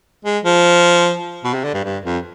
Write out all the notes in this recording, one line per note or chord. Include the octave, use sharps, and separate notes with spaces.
G#3
F3
B2
C3
D3
G2
G2
F2